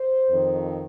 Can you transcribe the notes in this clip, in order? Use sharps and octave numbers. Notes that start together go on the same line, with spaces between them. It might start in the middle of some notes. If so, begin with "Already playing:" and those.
Already playing: C5
F2 D#3